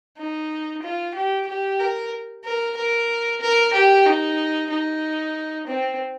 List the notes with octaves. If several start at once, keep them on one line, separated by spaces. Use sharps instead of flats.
D#4
F4
G4
G4
A#4
A#4
A#4
A#4
G4
D#4
D#4
C4